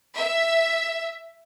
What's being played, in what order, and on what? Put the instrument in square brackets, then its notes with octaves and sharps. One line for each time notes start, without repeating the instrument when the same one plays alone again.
[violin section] E5